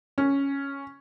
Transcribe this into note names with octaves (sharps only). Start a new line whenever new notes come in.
C#4